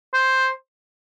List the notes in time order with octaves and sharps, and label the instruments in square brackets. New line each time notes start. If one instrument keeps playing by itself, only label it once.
[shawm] C5